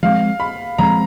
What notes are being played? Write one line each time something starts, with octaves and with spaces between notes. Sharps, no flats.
F3 G#3 C4 F5
B5
F3 G#3 C4 A#5